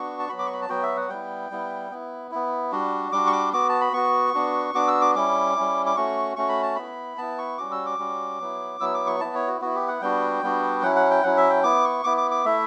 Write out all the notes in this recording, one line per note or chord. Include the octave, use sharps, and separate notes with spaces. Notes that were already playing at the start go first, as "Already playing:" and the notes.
Already playing: B3 D4 F#4 C#6
A5
F#3 B3 F#4 B5
D6
C#6
B5
A5
F#3 B3 F#4 G5
E5
F#5
G3 B3 E4 G5
G3 B3 E4
B3 E4
B3 E4
G3 D4 F#4
G3 D4 F#4 D6
C#6
D6
B3 F#4 D6
A5
B5
B3 F#4 C#6
B3 D4 F#4
B3 D4 F#4 D6
E6
D6
G3 C#4 E4 D6
G3 C#4 E4
D6
A3 C#4 F#4 C#6
A3 C#4 F#4 C#6
B5
A5
B3 E4 B5
B3 E4 A5
C#6
G3 C#4 F#4 D6
E6
D6
G3 C#4 F#4
F#3 B3 E4
F#3 B3 E4 E6
D6
C#6
B3 E4 A5
C#5
F#4
B3 E4 F#4
G4
F#5
G3 B3 D4 F#4 G5
G3 B3 D4 F#4
F#3 C#4 E4 F#5
F#5
G5
F#3 C#4 E4 F#5
E5
G5
B3 E4 D6
C#6
B3 E4 D6
D6
D6
A3 E4 E5